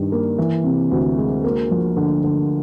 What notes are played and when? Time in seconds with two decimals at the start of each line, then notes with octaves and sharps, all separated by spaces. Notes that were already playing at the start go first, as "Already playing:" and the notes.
Already playing: G2 D#3 G3
0.12 A#3
0.38 E3
0.64 C3
0.91 D2
1.18 G#3
1.44 A#3
1.71 F3
1.97 D3
2.24 D3